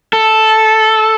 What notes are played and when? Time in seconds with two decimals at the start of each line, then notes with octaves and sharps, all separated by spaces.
0.13 A4